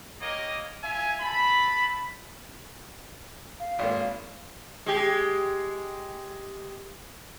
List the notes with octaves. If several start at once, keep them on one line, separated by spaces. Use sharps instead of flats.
A#3 G4 A#4 C#5 D#5
F4 E5 G#5
A3 A5 B5
F5
G#1 A#3
G#3 G4